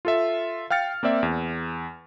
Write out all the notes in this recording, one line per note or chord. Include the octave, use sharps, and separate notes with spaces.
F4 A4 E5
F5 G5 F6 A6 C#7
A#3 C4 D5 E5
E2